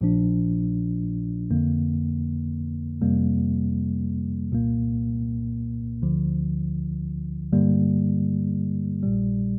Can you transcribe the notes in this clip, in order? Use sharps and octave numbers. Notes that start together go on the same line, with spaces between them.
A#1 A#2 F3 D4
F2 D3 A#3
F2 C3 G3 A#3
C2 A#2 A#3
D2 D3 F3
G2 D3 G3 A#3
A#1 A#2 G3